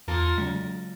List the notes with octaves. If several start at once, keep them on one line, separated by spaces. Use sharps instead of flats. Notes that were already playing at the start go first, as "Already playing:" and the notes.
E2 A#3 F4 A4
C#3 F#3 G#3